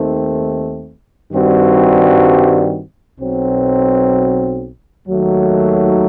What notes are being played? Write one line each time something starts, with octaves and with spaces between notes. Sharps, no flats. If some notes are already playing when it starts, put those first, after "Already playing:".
Already playing: D#2 D#3 A3 C4
G2 D#3 G3 C4 F#4
B1 B2 F#3 C4
D#2 D#3 F#3 A3